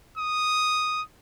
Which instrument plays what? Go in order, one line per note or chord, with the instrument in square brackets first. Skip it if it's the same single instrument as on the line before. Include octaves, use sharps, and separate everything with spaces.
[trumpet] D#6